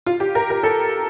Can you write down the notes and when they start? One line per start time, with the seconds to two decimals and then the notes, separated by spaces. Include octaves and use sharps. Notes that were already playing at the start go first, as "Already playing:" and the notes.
0.06 F4
0.20 G4
0.35 A#4
0.50 A#4
0.63 A4